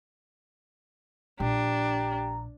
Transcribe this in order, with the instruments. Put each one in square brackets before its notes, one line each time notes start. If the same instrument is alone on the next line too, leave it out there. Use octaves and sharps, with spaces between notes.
[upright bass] A#1 [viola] D4 [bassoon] G4 [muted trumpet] A#5